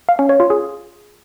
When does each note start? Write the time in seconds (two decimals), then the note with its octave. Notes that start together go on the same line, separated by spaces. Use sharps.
0.09 F5
0.19 C#4
0.29 C#5
0.40 F4
0.50 G#4